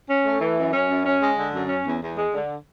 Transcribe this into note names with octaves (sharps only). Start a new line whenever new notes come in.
C#4
A3
E3
F#2
C#4
F#2
C#4
G#3
D3
F#2
C#4
E2
E2
G#3
D3